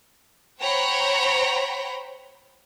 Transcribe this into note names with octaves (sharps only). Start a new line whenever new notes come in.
C5 C#5 F#5 G5 A#5 B5